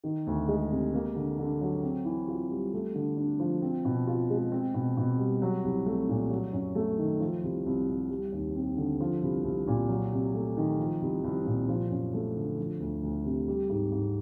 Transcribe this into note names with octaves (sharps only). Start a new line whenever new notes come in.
D#3
D2
G#3
C3
A#3
D3
D3
F#3
C4
E3
F4
G3
A3
D3
D4
F3
C4
B2
F4
G#3
C4
B2
B2
G3
F#3
C2
A3
A#2
F#3
F#2
A3
D#3
F3
C2
C2
C3
G3
D#2
C4
D3
F3
C2
C2
A#2
F#3
C3
A3
D#3
F3
C2
C2
A#2
F3
F#2
A3
D3
F3
D2
D2
C3
G3
G#2
G#2